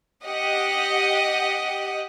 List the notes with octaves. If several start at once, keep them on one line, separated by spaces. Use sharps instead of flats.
G4 D#5 F#5